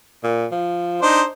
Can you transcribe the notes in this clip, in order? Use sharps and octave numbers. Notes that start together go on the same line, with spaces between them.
A#2
F3
D4 D#4 C5